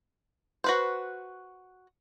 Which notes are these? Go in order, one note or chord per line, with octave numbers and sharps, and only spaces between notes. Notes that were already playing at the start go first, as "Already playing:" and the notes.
F#4 B4 C5